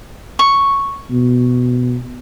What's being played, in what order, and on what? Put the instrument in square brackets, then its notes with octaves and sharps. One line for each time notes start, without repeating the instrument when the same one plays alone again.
[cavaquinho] C#6
[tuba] B2